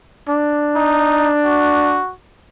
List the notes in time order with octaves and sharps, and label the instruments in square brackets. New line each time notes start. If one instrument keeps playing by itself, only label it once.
[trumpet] D4
[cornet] D#4
F#4